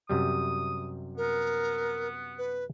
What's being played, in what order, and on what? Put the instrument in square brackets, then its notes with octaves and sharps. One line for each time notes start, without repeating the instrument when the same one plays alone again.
[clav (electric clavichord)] F#2 C3 G3 [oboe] D#6
[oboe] B3 [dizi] A#4
[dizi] B4